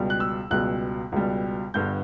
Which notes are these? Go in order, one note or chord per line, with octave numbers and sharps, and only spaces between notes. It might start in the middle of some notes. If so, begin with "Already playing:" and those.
Already playing: C#2 B2 G3
F#6
E6
C#2 B2 G3 F#6
C#2 B2 G3
G1 G2 D3 G6